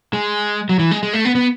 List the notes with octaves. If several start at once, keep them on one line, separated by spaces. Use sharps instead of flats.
G#3
F#3
E3
G#3
G#3
A3
B3
B3